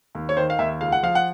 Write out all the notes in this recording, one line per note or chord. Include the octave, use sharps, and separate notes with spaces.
D#2
C#5
D#3 C5
F5
D#2 E5
C#2 F5
F#5
F3 F5
F#5